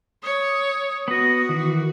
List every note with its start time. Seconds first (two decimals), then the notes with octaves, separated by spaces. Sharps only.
0.23 C#5 D#6
1.08 B3 F#4 D#5
1.49 D#3 E3